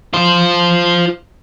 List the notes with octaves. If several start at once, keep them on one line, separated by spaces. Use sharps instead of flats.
F4 C5